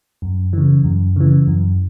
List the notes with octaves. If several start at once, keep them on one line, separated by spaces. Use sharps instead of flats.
F#2
C#3 E3
F#2
C#3 E3
F#2